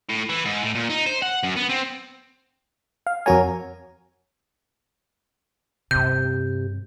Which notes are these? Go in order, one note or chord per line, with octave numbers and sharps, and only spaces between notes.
A2
E3
G#2
A2
A#2
D#4
C5
F#5
F#2
B3
C4
F5
F2 F#4 A#4 C#5 G#5
G2 C3 C#4 G6